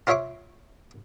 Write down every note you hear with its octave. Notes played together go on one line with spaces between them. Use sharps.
F4 C5 C#5 E5 C#6 D6